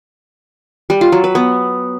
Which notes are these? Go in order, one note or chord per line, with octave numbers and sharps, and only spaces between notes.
G3
F4
F#3
B4
B3